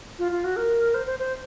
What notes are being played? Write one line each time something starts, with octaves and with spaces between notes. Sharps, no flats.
F4
F4
F#4
A#4
C5
C5
C5